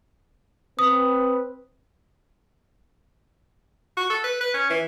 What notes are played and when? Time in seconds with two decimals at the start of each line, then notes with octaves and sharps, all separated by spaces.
0.79 C4 B4 D#6
3.97 F#4
4.10 A4
4.24 B4
4.41 B4
4.54 C#4
4.70 E3